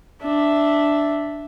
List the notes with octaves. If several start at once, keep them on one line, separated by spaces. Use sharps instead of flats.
D4 E5